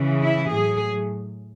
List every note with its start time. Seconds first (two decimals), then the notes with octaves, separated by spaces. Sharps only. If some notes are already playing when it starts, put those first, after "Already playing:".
Already playing: C#3 E3
0.21 E4
0.50 A2 F#3 G#4